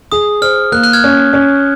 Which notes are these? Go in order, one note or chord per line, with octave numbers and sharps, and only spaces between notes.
G#4 D#6
C5 F6
A#3 F#6
F#6
F6 G#6
C#4
C#4